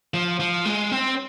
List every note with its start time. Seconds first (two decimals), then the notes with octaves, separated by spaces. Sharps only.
0.14 F3
0.40 F3
0.65 G#3
0.91 C4